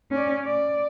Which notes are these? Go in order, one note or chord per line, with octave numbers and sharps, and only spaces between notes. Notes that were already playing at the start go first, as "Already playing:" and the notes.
C#4 D5
D5